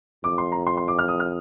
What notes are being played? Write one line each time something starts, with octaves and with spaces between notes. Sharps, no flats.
F2 D6
C6
A#5
C6
C6
D6
F6
D#6
F6